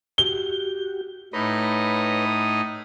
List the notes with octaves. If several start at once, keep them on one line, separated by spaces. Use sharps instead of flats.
F#4 G4 G7
A2 D#4 B4 C#5 D#5 B5